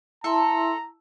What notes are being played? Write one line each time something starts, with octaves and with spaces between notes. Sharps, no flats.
E4 A4 E5 A#5 C6